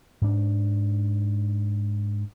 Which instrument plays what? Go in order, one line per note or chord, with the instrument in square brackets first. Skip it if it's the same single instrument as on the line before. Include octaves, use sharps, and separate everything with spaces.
[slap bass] G#2 D4